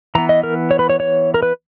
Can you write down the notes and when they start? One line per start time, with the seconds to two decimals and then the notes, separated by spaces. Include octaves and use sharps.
0.15 E3 B3 A#5
0.29 D#5
0.43 A#4
0.71 C#5
0.79 B4
0.90 C#5
1.00 C#5
1.34 A#4
1.43 B4